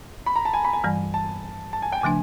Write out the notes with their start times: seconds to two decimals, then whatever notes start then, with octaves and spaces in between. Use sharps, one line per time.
0.26 B5
0.36 A#5
0.45 A5
0.54 G#5
0.65 B5
0.73 G#5
0.84 G2 E3 G3
1.14 A5
1.73 A5
1.82 G#5
1.92 G5
2.01 C#3 F3 A3 D4 G#5